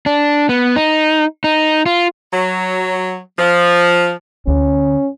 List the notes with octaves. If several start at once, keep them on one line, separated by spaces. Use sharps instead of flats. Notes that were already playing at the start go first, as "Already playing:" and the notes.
D4
B3
D#4
D#4
F4
F#3
F3
D2 C#4